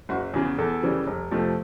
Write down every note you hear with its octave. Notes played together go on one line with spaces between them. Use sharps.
F#1 F#4
E2 C#3 G#4
E2 A4
C#3 E3 G3
F1
F2 C3 F3 A3